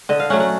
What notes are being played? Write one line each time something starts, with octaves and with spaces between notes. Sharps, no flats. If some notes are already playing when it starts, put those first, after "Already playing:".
D3 D#5
F5
F#3 A3 C#4 F#5
F#5